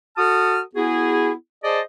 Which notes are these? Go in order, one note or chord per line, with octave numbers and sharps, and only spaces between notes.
F#4 A4 A5 D#6 F6
B3 E4 F#4 G#4
G#4 C5 D5 D#5 A5